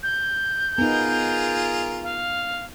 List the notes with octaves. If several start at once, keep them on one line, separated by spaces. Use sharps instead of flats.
G6
B3 D#4 F4 G#4 A#4
F5